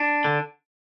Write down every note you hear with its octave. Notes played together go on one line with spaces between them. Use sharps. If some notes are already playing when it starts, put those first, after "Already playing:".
Already playing: D4
D3